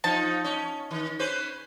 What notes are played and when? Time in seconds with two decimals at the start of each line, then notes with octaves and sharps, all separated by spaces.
0.04 F3 D#4 A5
0.44 C#4
0.91 D#3
1.19 C#4 B4 C5